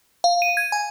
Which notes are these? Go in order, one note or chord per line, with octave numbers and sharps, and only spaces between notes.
F5
D#7
G#6
G#5